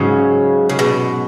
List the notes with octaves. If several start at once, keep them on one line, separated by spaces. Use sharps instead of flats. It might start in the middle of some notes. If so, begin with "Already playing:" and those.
Already playing: G#2 C#3 F#3 C#4
C#3
B2